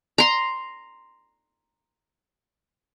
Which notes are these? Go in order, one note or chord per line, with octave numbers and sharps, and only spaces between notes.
A#5 C6